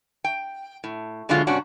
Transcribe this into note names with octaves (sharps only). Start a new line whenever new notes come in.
G5
A2
B2 D3 F#3 G#3 F4
G2 C3 C#4 D4 F#4